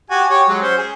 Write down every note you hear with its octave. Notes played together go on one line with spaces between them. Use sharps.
F#4 G4 G#5
G4 C#5
F#3 G#3
C#4 C5
G#4